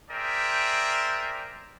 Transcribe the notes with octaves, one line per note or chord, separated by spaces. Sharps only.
G#4 A#4 C5 D5 E5 G5